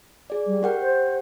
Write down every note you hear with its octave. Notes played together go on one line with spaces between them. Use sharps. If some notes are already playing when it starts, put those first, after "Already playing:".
G#4 D5
G3
G4 A#4 F#5 G5
C5